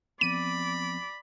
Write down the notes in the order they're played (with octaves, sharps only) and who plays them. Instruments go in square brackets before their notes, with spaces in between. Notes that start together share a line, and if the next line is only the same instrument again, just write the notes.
[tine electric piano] F3 B3 C4 [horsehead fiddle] D5 [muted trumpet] B5 [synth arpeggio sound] D#7